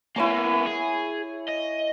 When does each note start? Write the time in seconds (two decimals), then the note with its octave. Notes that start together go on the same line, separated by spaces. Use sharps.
0.16 A#3 B3 E4 C#5 G#5
0.66 G#4
1.48 D#5